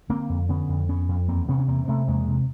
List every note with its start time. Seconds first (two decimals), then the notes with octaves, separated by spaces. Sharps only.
0.09 D3 A#3 C4
0.29 F2
0.49 D3 B3 C#4
0.69 F2
0.88 F2 B3 C#4
1.09 F2
1.28 E2 A#3 C4
1.48 C3 B3 C#4
1.59 C#4
1.68 E2 A#3 C4
1.88 C3 A3 B3
2.08 E2 G#3 A#3
2.28 C3